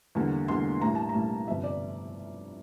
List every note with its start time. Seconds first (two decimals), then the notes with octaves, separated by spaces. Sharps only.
0.15 E2 D3 G3 A#3
0.48 E2 D3 G3 A#3 C6
0.81 A1 A2 G3 A#3 A#5
0.95 A5
1.09 A#5
1.14 A1 A2 G3 A#3
1.48 G1 F2 C3 G3 E5
1.64 D5